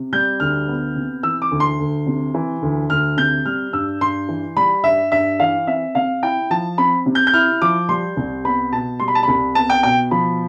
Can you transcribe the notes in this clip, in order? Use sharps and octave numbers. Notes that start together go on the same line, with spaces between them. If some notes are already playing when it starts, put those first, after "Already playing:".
Already playing: C3
G3 G6
D2 F6
B3
C3
E3 E6
D6
D2
C6
D2
C3
E3
D2
D2 F6
C3 G6
G3 F6
G2 E6
G2 C6
E3
G3 B5
G2 E5
G2 E5
E3 F5
C4 E5
C3 F5
E4 G5
F3 A5
C4 B5
C3
G6
G6
E4 F6
F3 D6
G3 C6
C2
B3 B5
B2 A5
G3 C6
B5
A5
C2 B5
B3 A5
G5
B2 G5
F3 B5